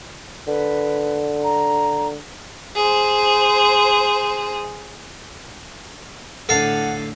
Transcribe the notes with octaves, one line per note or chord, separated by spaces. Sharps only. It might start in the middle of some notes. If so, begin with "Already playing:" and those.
D3 B4
A#5
G#4 C5
A2 D3 A4 F5 F#5